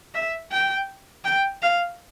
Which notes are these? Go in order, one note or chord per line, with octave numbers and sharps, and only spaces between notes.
E5
G5
G5
F5